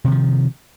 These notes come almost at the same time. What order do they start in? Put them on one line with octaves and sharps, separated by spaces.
C3 D#3 F3